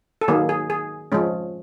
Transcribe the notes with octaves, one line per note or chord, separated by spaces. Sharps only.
A4
D#3 F#3 A#3 G#4
G#4
G#4
F3 G#3 C#4